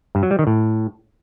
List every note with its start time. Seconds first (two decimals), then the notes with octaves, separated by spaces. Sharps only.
0.15 G2
0.23 F#3
0.31 G3
0.39 D#3
0.47 A2